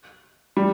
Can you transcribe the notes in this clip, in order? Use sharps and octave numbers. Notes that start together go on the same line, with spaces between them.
G3